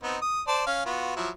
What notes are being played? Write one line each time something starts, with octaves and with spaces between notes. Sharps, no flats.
B3 C4 D#4
D#6
C5 D5 A5
C#4 F5
B3 F4 F#4
F3 F#3 E4